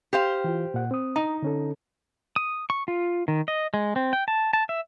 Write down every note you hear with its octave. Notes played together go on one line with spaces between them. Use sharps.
G4 C5 F5
E3 F4
A#2 F#5
C4 D#6
D#4 A#5
D3 C#4 A4
D#6
C#6
F4
D#3
D#5
G#3
C4
G5
A5
A5
E5